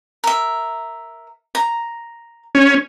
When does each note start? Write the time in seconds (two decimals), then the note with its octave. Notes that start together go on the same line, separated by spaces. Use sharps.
0.24 A#4 E5
1.55 A#5
2.55 C#4